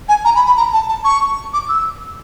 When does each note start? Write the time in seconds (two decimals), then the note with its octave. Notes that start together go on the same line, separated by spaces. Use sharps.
0.09 G#5
0.25 A#5
0.35 B5
0.46 B5
0.57 A#5
0.73 A5
0.88 A5
1.05 C#6
1.53 D6
1.69 E6